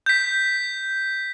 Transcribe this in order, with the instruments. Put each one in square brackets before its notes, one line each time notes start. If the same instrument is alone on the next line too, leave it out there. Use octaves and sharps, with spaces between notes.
[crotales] G6 B6